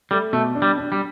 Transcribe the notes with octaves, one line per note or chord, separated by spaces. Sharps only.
G3 A3
B2 A3
D4
G3
D4
G3